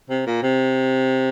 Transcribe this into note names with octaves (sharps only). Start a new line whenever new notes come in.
C3
A#2
C3